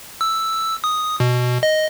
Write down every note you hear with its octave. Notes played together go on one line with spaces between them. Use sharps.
E6
D#6
B2
D#5